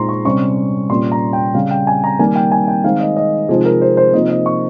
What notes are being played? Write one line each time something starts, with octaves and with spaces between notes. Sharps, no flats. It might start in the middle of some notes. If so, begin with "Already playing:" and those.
Already playing: A#2 G#3 C4 D#4 A#5 C6
C#6
C3 G3 C#4 C#6
A#2 G3 A#3 C#4 C6
A#5
G5
C#3 G3 C#4 F5
G5
G#5
A#5
D#3 G3 A#3 G#5
G5
G#5
G5
D#3 G#3 C4 F5
D#5
D#5
C3 F3 G#3 C4 D#4 G#4
A#4
C5
C5
C3 F3 A#3 D#4 D#5
D#5
C#6